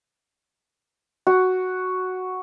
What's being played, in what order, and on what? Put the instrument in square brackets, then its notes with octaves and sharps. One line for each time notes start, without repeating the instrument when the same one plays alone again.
[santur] F#4